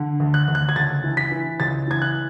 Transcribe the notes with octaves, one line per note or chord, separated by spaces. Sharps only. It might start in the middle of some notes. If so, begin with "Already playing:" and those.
Already playing: D3
D2
F#6
D2
F#6
G#6
C#2 A6
E3
B6
E3
C#2 A6
E3 G#6
F#6